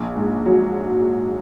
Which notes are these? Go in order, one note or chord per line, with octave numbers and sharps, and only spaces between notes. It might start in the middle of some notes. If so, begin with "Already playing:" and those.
Already playing: A#1
G#2
F#3